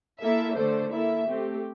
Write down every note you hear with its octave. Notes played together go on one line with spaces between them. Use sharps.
A#3 E4 A4 E5
D3 A3 D4 A4 C5
A#3 E4 A4 E5
A3 C4 G4